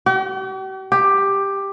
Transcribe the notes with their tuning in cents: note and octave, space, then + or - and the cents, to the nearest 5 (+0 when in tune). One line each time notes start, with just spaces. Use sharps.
G4 -45
G4 +10